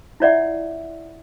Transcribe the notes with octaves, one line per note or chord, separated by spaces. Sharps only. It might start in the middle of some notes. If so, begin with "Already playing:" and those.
E4 F4 C#5 D5 E5 F#5